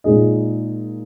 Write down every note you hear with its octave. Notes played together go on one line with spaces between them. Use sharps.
A#2 G#3 D#4 G#4 D#5